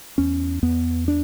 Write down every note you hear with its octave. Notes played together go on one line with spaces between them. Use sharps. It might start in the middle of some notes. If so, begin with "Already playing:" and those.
E2 C#4
E2 B3
D4